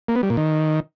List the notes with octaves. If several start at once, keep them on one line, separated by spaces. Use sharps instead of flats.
A#3
B3
G3
A#2
D#3